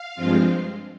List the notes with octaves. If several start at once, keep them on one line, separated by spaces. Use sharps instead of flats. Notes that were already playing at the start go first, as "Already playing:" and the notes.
Already playing: F5
G2 F3 G#3 C4 F4